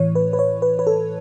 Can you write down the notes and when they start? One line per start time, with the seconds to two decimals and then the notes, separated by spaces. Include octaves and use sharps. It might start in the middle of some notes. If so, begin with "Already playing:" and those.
Already playing: A2 E3 C#5
0.15 B4
0.33 B4
0.39 C#5
0.62 B4
0.79 B4
0.87 A4